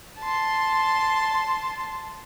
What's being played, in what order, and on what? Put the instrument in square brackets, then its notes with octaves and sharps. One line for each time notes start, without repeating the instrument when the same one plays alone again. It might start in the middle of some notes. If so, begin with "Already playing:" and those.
[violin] A5 C6